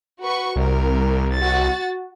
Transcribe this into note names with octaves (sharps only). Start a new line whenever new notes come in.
F#4 B4 C#6
C2 A#4
F#4 A6